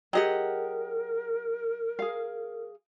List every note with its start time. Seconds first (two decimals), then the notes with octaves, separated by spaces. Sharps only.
0.13 F#3 G4 G#4 A#4 D#5 F#5 G5
1.99 G#4 F5